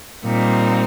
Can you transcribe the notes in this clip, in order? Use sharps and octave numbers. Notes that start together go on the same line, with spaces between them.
A#2 G3 C4 D#4